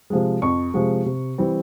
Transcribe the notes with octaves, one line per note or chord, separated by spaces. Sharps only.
C3 F3 G#3
F2 C#6
C3 F3 G#3
C3
E3 G3 C4